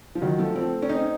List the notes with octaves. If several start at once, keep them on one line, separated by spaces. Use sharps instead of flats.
F3
D#3 F#3
F3 A3
A3 C4
C#4
C4 D#4